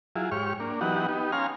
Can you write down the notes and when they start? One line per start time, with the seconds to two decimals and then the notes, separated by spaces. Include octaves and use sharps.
0.16 F#3 E4 F4 G#4
0.31 G#2 G4 C#5 C#6 F6
0.60 A#3 D4
0.81 E3 F#3 B3 D#4 G4 F#5
1.09 B3 D#4 G4
1.32 C#4 F5 G#5 A#5 C6 F6